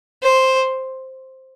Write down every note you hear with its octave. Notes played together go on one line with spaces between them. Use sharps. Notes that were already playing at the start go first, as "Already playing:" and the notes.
C5